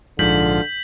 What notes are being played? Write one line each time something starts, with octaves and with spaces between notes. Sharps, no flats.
A#1 G#2 D3 F3 G6 B6 F#7